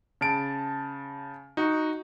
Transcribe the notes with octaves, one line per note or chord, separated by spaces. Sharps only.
C#3 A5 D7
D#4 F#4